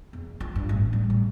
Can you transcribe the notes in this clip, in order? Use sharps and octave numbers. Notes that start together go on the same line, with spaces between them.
E2
F4
G2
A1
G3
A2